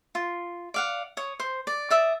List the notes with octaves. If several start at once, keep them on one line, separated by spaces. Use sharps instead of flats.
F4
D5 F5 F#5
C#5 D#6
C5
D5
D5 E5 D#6